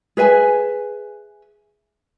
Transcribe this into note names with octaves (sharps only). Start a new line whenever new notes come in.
G#4 B4 E5 G#5